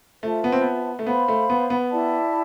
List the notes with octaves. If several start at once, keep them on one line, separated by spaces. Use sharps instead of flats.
A3 F4 C5 E5 A5
B3
C4
B3
A3
B3 C5 F5 B5
A3
B3
B3
E4 G4 D5 A5